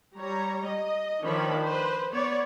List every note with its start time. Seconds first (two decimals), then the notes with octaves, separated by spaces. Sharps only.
0.17 G3 C#5 A#5
0.65 D#5
1.24 D#3 F3 D4 C#5 B5
1.63 B4 C5
2.13 B3 C#5 D5